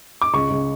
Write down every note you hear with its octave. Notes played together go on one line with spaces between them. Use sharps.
D6
C#2 C#6
C#2